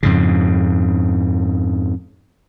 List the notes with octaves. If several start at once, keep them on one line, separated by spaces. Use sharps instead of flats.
F2 G#2 C#3